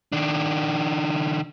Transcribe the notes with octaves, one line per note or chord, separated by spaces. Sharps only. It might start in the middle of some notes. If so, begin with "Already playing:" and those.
D#3 D4